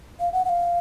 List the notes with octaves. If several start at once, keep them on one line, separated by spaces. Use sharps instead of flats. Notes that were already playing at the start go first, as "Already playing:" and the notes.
F5
F#5
F#5
F5